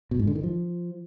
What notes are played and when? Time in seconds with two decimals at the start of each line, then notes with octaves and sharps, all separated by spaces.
0.11 B2
0.19 G#2
0.27 D3
0.35 D#3
0.43 F3